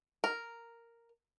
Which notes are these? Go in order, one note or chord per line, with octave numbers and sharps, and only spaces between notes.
A#4